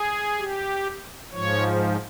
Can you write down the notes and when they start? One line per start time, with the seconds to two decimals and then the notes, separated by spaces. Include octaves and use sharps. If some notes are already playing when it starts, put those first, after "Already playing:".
Already playing: G#4
0.39 G4
1.31 G#2 F3 C#5